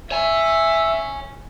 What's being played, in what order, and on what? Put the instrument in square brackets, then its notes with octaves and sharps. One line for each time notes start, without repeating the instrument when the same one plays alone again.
[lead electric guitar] C#5 G#5 [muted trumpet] E5